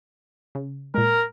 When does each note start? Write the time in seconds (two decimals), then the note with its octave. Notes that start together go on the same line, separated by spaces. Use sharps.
0.55 C#3
0.94 A#2 G#3 A#4